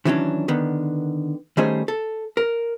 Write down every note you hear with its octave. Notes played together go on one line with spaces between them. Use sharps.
D#3 E3 F#3 A#3 C#4 D4
D3 D#3 B3
D#3 G3 A3 C#4 G#4 C5
A4
A#4